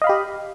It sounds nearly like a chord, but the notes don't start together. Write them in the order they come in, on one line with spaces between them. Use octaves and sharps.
D#5 F5 B5 G4